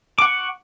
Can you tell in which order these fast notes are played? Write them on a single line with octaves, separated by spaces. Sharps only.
D6 F#5 C#6